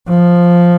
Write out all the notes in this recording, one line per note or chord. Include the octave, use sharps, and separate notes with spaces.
F3